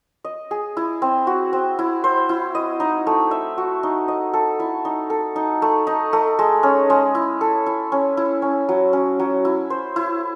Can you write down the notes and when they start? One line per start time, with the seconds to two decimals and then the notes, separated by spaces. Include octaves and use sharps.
0.24 D#5
0.51 G#4
0.77 E4
1.02 C4
1.27 F#4
1.53 C4
1.79 E4
2.04 C5
2.29 E4
2.55 D#5
2.80 D#4
3.07 A3
3.31 E5
3.58 F#4
3.83 D#4
4.08 D#5
4.33 A4
4.60 E4
4.85 D#4
5.10 A4
5.36 D#4
5.62 A3
5.87 D#4
6.13 A3
6.39 G#3
6.63 C#4
6.90 G#3
7.15 E4
7.41 A4
7.66 E4
7.92 C#4
8.17 E4
8.42 C#4
8.69 F#3
8.93 C#4
9.19 F#3
9.45 E4
9.70 C5
9.96 E4